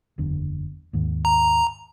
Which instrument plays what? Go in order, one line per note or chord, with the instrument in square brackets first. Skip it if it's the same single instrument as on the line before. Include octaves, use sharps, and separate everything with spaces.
[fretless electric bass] F#1 E2 D3
D#2 G#2 D#3
[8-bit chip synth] A#5